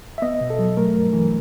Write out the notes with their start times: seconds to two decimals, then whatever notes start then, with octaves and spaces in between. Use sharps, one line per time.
0.18 E5
0.22 B3 D#5
0.41 B2
0.50 A4
0.59 F#3
0.77 A3 A#4
0.95 G2
1.13 E3